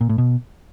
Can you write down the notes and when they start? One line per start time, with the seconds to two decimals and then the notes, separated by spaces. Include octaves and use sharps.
0.01 A#2
0.09 A2
0.18 B2